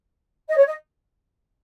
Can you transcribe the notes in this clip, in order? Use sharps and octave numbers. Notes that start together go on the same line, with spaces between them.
D#5
C#5
D#5